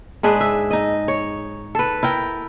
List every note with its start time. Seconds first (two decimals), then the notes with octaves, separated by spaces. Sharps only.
0.23 G#2 D4 G#4 B4
0.41 E5
0.71 D#4 D#5
1.08 C#5
1.75 A4 B4
2.03 E4 A#4 G5